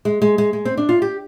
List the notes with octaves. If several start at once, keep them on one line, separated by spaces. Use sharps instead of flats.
G#3
G#3
G#3
G#3
C4
D4
F4
G4